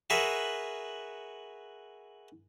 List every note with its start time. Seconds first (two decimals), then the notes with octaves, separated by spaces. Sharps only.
0.10 F#4 G#4 A#4 B4 E5 F#5